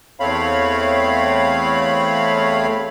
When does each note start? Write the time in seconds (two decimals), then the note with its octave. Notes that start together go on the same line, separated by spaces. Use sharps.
0.20 E2 A3 C4 C#5 F5 B5